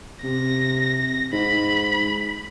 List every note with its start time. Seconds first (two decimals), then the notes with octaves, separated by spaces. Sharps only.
0.24 C3 A#6
1.33 G#2 B5